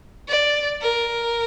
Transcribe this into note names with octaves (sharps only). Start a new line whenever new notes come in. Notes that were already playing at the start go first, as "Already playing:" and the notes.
D5
A#4